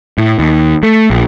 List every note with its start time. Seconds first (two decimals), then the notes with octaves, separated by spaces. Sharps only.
0.18 A2
0.39 D#2
0.83 A3
1.10 A#1